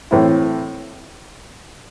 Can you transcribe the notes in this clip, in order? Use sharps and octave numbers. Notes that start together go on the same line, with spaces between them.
A2 E3 C4 E4